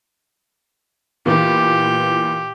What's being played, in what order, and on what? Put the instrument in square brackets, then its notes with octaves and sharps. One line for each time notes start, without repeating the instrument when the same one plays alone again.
[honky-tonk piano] A#2 E3 B3 [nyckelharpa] G4